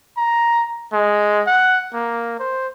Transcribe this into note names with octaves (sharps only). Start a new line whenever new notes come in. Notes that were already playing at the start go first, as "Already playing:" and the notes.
A#5
G#3
F#5
A#3
C5